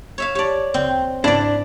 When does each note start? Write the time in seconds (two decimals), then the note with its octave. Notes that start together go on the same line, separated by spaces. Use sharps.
0.18 C#5 E5 F5
0.35 G4 C#5 D5 A5
0.74 D2 C#3 C4 D5
1.24 G#2 C#3 D4 E4 D5